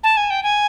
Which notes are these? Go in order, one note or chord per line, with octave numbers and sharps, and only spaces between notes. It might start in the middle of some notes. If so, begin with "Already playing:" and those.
A5
G#5
G5
G#5